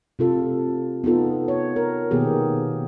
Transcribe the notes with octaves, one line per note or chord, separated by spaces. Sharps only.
C3 F4 A4
B3 D#4 F4 A4
C#5
A#4
B2 D#3 A#3 B3 G4 G#4